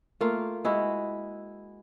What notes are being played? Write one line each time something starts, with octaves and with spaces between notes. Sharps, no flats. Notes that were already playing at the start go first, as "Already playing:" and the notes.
A3 A#3 F4
G#3 E4 F#4